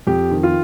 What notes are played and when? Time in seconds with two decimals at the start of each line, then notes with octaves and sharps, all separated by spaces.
0.07 F2 G4
0.31 D#3
0.43 F4